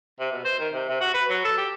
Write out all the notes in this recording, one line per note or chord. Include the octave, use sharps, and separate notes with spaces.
C3
B2
C5
D#3
C3
C3
F#4
B4
F#3
A4
G4